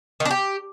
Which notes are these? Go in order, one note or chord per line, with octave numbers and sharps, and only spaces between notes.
D#3
D4
G4